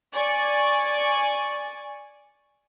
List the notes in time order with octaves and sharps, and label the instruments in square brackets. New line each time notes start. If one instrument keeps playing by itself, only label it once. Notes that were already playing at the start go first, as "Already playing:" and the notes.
[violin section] D5 G#5 C#6